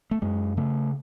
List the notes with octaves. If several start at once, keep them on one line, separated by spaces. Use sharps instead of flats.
A3
F#2 G#3
C#3 A3